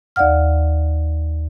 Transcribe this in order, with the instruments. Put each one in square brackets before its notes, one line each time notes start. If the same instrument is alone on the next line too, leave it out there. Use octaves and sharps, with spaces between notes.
[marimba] D#2 D5 F5 F#5 F6